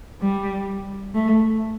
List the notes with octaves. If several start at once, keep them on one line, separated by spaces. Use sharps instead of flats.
G3
A3